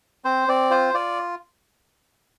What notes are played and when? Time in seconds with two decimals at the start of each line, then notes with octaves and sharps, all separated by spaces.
0.25 C4 C5
0.48 C4 D5
0.70 F4 C5
0.94 F4 D5